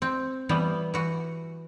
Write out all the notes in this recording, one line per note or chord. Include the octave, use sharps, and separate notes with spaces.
C4
E3 G3 B3
E3 F#4